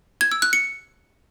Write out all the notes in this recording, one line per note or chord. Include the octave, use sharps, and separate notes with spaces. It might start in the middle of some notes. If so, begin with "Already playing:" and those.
G#6
E6
F#6
C#7